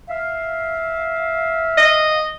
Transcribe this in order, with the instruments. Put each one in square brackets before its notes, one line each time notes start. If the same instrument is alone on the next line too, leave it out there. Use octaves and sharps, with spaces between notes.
[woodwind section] E5 F5
[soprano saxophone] D#5